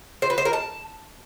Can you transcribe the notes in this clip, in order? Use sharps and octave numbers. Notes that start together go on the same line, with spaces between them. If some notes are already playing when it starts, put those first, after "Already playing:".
C5
B4
C5
A#4
A5